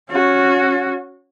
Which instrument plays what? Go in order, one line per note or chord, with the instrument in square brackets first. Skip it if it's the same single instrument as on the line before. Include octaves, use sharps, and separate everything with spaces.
[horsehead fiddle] C#4 F#4